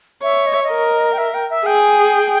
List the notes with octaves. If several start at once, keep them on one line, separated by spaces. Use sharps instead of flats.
C#5 E5
D#5
E5
D#5
A#4
G5
E5
G5
E5
G#4 G5